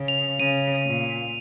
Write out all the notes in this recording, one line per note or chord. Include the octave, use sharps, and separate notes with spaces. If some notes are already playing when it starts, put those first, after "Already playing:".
Already playing: C#3
F7
C#3 D#7
A#2